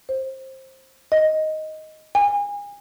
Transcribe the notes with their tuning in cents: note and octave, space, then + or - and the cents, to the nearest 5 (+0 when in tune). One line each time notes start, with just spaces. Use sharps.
C5 +20
D#5 +5
G#5 -35